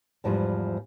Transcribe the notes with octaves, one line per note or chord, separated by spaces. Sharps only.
E2 G#2 E3 F3 G3